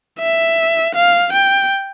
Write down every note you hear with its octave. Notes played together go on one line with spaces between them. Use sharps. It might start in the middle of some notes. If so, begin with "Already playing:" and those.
E5
F5
G5